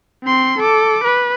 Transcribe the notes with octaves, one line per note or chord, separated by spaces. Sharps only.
C4 C6
A4 D6
B4